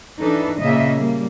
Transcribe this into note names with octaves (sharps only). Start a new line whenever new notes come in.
E3 D4 D#4 A4 B4
A#2 C#3 A#3 D#5 E5
G3 A#3